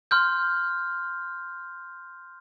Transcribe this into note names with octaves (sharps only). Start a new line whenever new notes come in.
C6 F6 G6